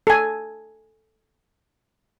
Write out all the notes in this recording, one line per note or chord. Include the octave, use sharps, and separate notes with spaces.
A4 G#5